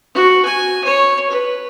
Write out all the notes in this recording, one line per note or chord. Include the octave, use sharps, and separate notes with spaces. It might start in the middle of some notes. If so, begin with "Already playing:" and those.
F#4
G#5
C#5
B4